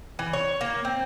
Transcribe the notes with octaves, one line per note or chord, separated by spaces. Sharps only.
E3
C#5
A#3
C4